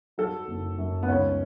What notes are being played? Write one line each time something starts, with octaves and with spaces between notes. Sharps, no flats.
F#3 A4
F#1
F#2
B3
C#2 C#4